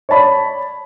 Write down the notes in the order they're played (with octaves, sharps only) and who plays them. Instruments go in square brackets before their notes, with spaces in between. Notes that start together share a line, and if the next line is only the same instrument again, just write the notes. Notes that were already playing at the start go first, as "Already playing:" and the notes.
[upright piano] C#5 D5 A5 B5